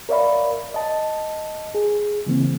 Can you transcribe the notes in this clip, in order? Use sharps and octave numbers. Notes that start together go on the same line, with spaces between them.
A#4 C#5 D5 E5 F5 B5
D#5 A5
G#4
C#3 E3 A#3 C4